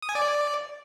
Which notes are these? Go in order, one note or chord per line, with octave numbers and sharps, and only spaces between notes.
D#6
G#5
D5